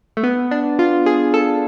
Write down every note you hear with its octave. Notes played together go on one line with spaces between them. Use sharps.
A3
B3
D4
F4
G#4
A4